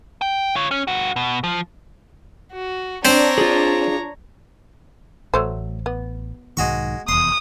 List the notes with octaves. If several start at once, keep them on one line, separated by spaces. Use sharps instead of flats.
G5
F4 C#5
C#4
G2 F#4
B2
F3
F#4
C4 D4 C5 C#5 A#5
F4 G#4
A1 F#3 A3 C5
B3
B1 G#2 D#3 G#3 F#4 C#6
F1 E2 C6 D#6